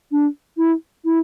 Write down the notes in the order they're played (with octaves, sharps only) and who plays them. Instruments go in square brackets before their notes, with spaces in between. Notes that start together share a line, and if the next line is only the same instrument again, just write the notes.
[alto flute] D4
E4
E4